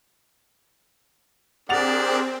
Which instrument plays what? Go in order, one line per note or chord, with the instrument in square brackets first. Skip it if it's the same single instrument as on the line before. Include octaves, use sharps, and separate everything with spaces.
[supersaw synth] C4 [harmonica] D4 [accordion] G4 G#4 A#4 [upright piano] F#5 A6 F7